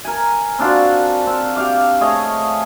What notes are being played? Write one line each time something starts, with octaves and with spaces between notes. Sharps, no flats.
A#4 G#5
C4 D4 F4 F#4
C4
G4 F5 D6
A3 G#4 C#5 D#5